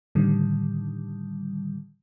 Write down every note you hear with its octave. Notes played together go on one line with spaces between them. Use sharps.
A2 D3 D#3 G3